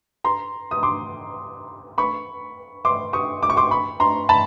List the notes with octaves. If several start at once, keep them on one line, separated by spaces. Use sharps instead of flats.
A#5 C6
D#6
C6 D6
B5 C#6
C6 D6
C#6 D#6
D6
C#6
C6 D6
B5 C#6
A#5 C6
A5 B5